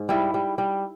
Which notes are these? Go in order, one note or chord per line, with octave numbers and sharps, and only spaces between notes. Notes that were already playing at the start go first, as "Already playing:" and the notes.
Already playing: G#2
G3 E4
G3
G3